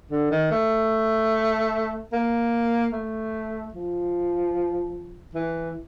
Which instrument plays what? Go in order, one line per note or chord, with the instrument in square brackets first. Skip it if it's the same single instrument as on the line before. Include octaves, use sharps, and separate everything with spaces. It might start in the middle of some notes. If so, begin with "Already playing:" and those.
[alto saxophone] D3
D#3
A3
A#3
A3
F3
E3